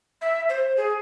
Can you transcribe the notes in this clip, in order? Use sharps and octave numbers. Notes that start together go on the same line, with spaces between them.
E5
C5
G#4